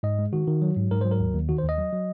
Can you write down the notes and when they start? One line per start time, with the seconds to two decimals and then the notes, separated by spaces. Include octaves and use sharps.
0.03 G#2 D#5
0.19 G#3
0.33 D#3 F#4
0.47 D#3
0.62 F#3
0.77 G#2
0.91 G#2 A#4
1.01 F#3 C5
1.11 A#4
1.20 D#2
1.35 D#2
1.49 D#3 F#4
1.58 C5
1.64 D#2
1.69 D#5
1.78 F#3
1.93 F#3